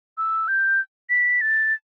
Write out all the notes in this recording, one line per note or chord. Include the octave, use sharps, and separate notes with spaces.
E6
G6
B6
A6